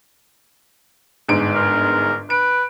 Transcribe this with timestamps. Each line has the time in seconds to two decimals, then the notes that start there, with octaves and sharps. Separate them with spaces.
1.28 G1 G#2 D7
1.55 A#4
2.30 B4 D7